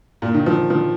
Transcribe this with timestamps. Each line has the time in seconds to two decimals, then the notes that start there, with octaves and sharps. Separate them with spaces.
0.22 A#2
0.34 D#3
0.46 F3
0.70 F3